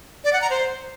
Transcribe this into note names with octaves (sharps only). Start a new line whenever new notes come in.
D5
F#5
A#5
C5